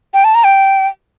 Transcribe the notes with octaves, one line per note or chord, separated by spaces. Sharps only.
G5
A5
A#5
G5